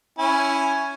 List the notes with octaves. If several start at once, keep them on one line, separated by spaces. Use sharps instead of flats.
C#4 E4 G#5